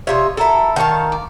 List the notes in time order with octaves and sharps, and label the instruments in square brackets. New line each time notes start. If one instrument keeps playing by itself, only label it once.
[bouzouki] C3 F4 E5 [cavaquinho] C#5 D#5
[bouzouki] E4 A4 [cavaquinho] F#4 A#4
[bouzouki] D#3 F5 A5 [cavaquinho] A4 C5 C#6
[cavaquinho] D5